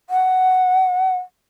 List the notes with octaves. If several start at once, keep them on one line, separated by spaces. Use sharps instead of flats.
F#5